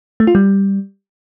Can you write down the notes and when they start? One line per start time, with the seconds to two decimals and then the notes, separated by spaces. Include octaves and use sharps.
0.20 A3
0.27 F4
0.35 G3